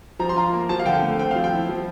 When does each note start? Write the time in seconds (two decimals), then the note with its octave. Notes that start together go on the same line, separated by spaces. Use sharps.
0.19 F3 A#5
0.29 C6
0.36 F4 A#5
0.53 A#3
0.69 F3 A5
0.79 F5
0.86 D3 G5
1.02 A3
1.19 C4 G5
1.31 F3 F5
1.44 G5
1.52 E4
1.69 F3